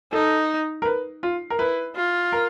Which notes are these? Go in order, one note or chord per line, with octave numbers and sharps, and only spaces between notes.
D#4 A4
A#4
B4
F4
A#4
E4 B4
F4
A#4